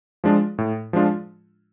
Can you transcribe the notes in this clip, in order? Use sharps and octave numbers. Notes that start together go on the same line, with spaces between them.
F3 G#3 D4 F4
A2
F3 G#3 D4 F4